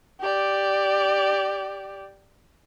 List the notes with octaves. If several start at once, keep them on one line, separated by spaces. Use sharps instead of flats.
G4 D5